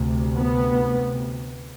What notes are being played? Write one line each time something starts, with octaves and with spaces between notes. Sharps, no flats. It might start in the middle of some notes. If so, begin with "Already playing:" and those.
Already playing: D2 C3
B3